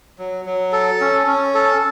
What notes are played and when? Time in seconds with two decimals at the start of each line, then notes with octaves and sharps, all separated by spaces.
0.19 F#3
0.45 F#3
0.72 A4
1.01 C#4
1.27 C#4
1.54 A4